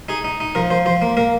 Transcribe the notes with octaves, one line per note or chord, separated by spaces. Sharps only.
D#4 G#4
D#4
D#4
F3 A#4
F3 C5
F3 C5
A#3
A#3 A#4